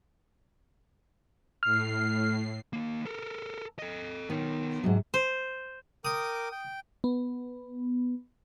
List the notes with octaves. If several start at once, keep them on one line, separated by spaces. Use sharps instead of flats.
A2 F6 C7
D#2 A#3
A4 A#4
A4 D#5
D#3 B3 C#5
G#2 C3 F#3
C5
A#4 G5 D6 D#6
G5
B3